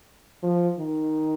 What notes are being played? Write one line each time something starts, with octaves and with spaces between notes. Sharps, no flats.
F3
D#3